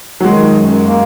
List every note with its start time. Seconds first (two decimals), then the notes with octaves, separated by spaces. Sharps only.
0.20 F#3
0.25 D#3 G#3
0.56 F#2
0.86 A#3